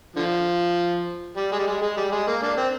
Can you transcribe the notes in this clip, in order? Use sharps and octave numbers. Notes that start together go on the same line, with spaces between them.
D3 F3
G3
G#3
G3
G#3
G#3
G3
G#3
A#3
A#3 D4
C4